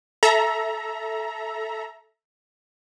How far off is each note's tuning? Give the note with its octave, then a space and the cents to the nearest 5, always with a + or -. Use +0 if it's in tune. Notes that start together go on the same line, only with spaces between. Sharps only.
A4 -5 E5 +0 A#5 +20